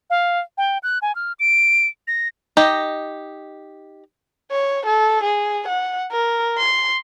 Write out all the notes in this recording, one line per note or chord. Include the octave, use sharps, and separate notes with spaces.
F5
G5
F#6
G#5
F6
D7
A#6
D#4 G4 D#5
C#5
A4
G#4
F#5
A#4
C6